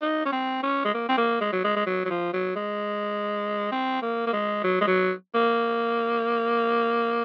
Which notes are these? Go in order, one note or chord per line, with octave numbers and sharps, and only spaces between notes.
D#4
C#4
C4
C#4
G#3
A#3
C4
A#3
G#3
F#3
G#3
G#3
F#3
F#3
F3
F#3
G#3
C4
A#3
A#3
G#3
F#3
G#3
F#3
A#3